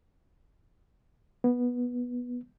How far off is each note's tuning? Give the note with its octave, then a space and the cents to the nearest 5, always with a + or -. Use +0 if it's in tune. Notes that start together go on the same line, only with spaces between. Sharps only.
B3 -10